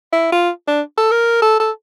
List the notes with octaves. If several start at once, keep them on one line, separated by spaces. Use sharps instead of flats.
E4
F4
D4
A4
A#4
A4
A4